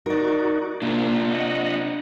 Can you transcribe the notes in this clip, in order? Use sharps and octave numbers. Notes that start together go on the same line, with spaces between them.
D#4 F#4 A#4 D5
C3 A#3 D4 F4
D#5 F#5